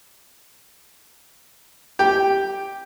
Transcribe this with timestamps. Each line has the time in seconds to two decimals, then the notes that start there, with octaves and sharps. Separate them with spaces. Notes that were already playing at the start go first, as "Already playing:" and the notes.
1.99 G4